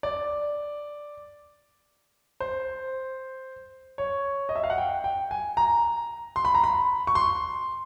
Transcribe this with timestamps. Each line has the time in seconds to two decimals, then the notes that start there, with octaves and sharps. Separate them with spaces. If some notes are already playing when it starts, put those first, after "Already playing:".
0.03 D5
2.40 C5
3.98 C#5
4.49 D#5
4.56 E5
4.64 F5
4.70 F#5
4.78 G5
5.04 G5
5.31 G#5
5.57 A#5
6.36 C6
6.45 B5
6.55 A#5
6.64 B5
7.07 C#6
7.15 C6